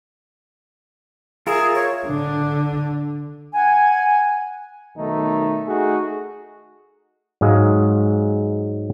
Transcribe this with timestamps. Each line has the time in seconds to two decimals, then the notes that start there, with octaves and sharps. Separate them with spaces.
1.47 F4 G#4 A#4 E5
1.75 C#5
2.07 D3 D4
3.55 F#5 G#5
4.97 B1 D#3 A3 D#4
5.67 A3 D#4 F#4 G#4
7.41 G#2 F#3 G#3 F5